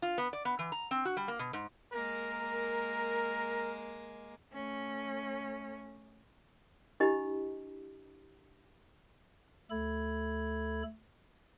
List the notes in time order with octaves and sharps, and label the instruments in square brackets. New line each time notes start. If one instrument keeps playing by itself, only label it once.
[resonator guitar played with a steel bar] F4
B3
D5
B3
E3
A#5
C4
F#4
G3
A#3
B2
G#2
[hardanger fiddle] G#3 A#3 [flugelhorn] A#4
[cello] A3 C#4
[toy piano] D4 E4 G4 D#5 B5
[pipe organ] D2 A3 A4 B5 G#6